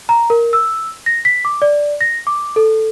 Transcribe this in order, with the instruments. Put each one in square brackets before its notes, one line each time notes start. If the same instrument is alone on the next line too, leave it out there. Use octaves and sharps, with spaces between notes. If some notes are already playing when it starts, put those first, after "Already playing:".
[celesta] A#5
A#4
E6
A#6
B6
D6
D5
A#6
D6
A4